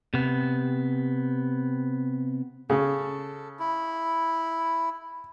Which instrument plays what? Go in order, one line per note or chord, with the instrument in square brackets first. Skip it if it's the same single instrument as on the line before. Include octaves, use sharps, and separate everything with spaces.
[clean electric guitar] C3 B3
[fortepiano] C#3 [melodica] A4
[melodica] E4